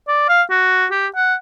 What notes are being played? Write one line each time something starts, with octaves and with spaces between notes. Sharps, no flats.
D5
F5
F#4
G4
F#5